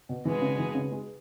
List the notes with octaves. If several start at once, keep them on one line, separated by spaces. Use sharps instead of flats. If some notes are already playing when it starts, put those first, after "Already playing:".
B2
B2 E3 G#3 B3 G#4
C#3
E3
C#3
G#3